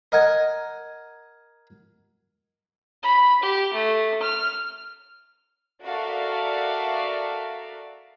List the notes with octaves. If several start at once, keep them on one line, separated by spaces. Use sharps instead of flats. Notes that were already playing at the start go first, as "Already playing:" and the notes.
A#4 D#5 F#5 G#5
B5
G4
A3
F6
F#4 A4 A#4 D5 E5 F5